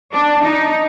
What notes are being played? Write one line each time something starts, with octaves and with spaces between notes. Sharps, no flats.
D4
D#4